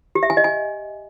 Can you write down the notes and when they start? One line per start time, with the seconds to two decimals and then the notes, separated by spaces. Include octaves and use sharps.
0.15 G4
0.23 E5
0.30 G#5
0.37 D#5
0.44 G#5